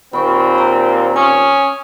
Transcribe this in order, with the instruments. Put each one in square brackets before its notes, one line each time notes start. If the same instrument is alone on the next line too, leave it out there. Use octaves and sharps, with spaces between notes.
[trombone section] D#2 A#2 C4 [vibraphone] B5 C#6
[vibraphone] D5 A#5
[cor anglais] C#4 [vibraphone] G#5 D#6